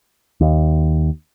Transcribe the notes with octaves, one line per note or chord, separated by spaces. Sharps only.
D#2